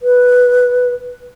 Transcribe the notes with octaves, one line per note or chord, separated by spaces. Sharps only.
B4